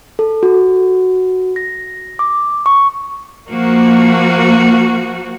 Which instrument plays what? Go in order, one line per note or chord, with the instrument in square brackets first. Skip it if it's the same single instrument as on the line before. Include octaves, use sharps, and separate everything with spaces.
[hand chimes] A4
F#4
A#6
D6
C#6
[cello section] F3 A#3 F#4